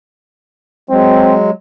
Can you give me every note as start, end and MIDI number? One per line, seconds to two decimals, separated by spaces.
0.90 1.50 54
0.90 1.50 56
0.90 1.34 60